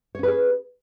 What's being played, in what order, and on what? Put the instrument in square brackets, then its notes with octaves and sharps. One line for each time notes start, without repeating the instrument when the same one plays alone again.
[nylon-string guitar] C#5
C#4
B4
G#4